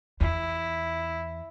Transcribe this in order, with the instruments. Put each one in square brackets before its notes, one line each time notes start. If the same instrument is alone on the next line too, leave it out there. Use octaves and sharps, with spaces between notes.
[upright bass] E2 [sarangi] E4